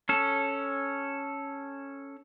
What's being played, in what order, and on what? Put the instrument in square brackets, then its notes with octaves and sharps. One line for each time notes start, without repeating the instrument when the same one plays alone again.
[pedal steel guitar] C#4 A4